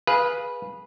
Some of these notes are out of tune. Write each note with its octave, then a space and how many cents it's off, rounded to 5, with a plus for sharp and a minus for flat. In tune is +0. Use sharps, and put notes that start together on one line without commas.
G#4 +0 B4 -15 F5 +0